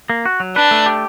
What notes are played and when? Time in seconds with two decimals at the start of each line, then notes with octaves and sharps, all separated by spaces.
0.10 A#3
0.25 F#4
0.40 F#3
0.56 D4 B4
0.71 A3
0.86 G4